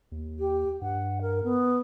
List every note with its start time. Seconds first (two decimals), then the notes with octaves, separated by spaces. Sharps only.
0.12 D#2
0.39 G4
0.82 G2 F#5
1.21 A#4
1.44 B3